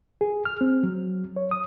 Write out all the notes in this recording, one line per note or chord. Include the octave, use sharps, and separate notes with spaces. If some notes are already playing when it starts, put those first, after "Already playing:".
G#4
F6
C4
F#3
C#5
D#6